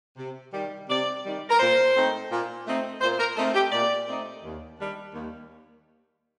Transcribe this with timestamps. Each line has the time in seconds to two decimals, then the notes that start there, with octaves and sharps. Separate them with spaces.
0.17 C3
0.53 D#3 G3
0.88 C3 D5
1.24 D#3 G3
1.48 A#4
1.59 A#2 C5
1.94 A3 C4 D#4
2.30 A#2
2.65 A3 C4 D#4
3.01 A#2 C5
3.19 A#4
3.37 A3 C4 D#4 A4
3.54 G4
3.72 A#2 D5
4.07 A3 C4 D#4
4.43 D#2
4.78 D#3 G3 D4
5.13 D#2